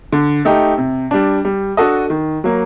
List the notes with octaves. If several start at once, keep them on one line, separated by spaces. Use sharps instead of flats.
D3
A3 D#4 G4
C3
G3 D4
G3
D4 F#4 A4 D#5
D#3
F#3 A#3